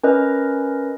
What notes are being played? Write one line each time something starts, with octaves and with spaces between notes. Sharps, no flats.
C#4 A#4 B4 D#5